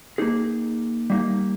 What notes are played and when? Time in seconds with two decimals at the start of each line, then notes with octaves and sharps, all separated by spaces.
0.18 A#3 D#4 G#4
1.10 G3 A#3 D#4